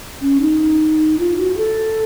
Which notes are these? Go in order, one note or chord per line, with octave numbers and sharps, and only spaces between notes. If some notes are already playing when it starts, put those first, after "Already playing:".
C#4
D#4
F4
F#4
A4